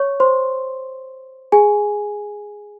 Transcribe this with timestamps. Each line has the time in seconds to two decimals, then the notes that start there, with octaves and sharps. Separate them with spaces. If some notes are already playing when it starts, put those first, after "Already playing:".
Already playing: C#5 C#6
0.20 C5 C6
1.52 G#4 G#5